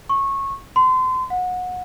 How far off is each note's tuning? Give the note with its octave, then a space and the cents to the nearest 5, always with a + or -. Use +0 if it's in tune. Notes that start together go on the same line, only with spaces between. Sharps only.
C#6 -20
C6 -30
F#5 -25